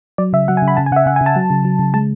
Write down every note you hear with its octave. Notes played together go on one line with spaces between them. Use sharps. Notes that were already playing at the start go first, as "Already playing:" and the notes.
F#3 D5
C#3 E5
F#3 F#5
G#5
C#3
B5
C#3 A5
G#5
C#3 E5 F#5
C#3 F#5
G#5
C#3
A5
F#3
C#3
F#3
C#3
G#3 A5